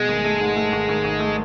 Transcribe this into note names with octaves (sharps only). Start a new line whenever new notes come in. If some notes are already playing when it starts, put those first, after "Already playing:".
Already playing: B2 G#3
G#1
A3
G#2
A3
G#1
G#1
G#1
A3